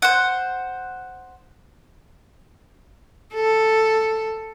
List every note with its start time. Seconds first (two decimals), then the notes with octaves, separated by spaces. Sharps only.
0.02 C5 F#5
3.34 A4